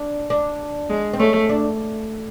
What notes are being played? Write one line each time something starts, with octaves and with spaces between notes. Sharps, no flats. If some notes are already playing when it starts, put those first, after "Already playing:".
Already playing: D4
D4
G#3
C4
A3 C#4
D4